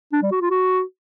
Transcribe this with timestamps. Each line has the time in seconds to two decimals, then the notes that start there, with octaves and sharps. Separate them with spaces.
0.13 D4
0.22 G3
0.32 F#4
0.41 F4
0.50 F#4